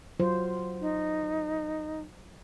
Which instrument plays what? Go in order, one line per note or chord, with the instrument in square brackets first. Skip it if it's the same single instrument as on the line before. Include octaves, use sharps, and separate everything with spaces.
[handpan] F#3 F4 C5
[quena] D#4